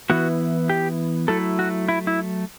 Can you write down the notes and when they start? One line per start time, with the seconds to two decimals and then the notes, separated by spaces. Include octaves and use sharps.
0.10 E3 B3 E4 F#4
0.70 G4
1.28 F#3 A3 E4 A4
1.59 F#4
1.89 E4
2.07 E4